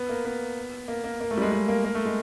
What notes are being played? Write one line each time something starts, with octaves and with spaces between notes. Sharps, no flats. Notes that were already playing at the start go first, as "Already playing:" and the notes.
Already playing: B3
A#3
B3
A#3
A#3
A#3
A3
G3
G#3
G#3
A#3
A#3
A3
G#3